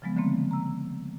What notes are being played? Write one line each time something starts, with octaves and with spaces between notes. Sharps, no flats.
C#3 F3 F#3 G#3 B3
D3 E3 A3 A#3 C4
A#5 E6